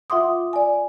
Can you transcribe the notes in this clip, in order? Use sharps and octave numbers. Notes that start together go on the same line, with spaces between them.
F4 E5 F#5 C6 D6 D#6
D5 G#5